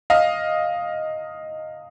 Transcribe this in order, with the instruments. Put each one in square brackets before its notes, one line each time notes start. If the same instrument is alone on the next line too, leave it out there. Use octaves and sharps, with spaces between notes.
[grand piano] D#5 F5